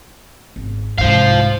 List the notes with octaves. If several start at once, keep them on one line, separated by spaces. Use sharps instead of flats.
G#1
C2 G#2 C5 F5